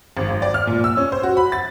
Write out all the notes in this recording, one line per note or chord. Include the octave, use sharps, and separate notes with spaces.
G#1
G#1
D5
F6
A#2
E6
C#4
C5
F#4
B5
A6